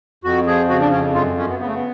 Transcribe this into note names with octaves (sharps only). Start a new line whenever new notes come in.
F2 F#4
F3 G#4
C#3 F#4
D4
F2 C#4
F#2 F4
F#2 C#4
B3
C#3 B3
A3
B3